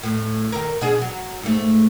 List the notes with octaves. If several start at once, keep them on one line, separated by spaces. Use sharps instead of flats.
A2
D#3 A#4
B2 D4 G#4
F#3
G#2 A3